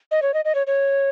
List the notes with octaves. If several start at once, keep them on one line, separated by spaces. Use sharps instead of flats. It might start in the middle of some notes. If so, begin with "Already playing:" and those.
D#5
C#5
D#5
D#5
C#5
C#5